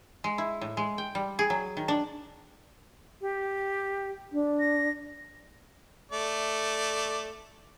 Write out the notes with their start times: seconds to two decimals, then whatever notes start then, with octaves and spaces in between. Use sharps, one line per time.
0.24 G#3
0.38 E4
0.61 A2
0.77 G#3
0.98 G5
1.15 G3
1.39 G#4
1.50 F#3
1.77 D#3
1.88 D4
3.21 G4
4.33 D4
4.60 A#6
6.12 A3 D5